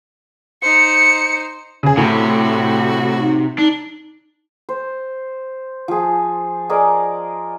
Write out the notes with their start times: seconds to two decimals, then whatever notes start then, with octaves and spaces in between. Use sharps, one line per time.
0.62 D#4 C5 C#7
1.83 C#3 G#4
1.97 A2 C3 F#4
3.19 D#4
3.59 D4 D#4
4.69 C5
5.88 F3 G#4
6.70 G#4 A#4 D5 D#5